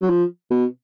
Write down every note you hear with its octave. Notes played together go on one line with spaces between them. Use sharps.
F#3
F3
B2